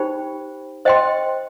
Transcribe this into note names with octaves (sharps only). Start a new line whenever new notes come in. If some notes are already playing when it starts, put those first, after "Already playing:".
Already playing: D#4 G4 C5 G5 B5
C5 D#5 G5 C6